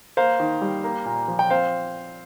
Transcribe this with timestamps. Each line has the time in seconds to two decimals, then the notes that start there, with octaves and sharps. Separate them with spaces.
0.17 A#3 C5 F5
0.40 D#3
0.61 G3
0.84 A#3
1.06 A#2
1.28 F3
1.39 G5
1.50 C4 C5 F5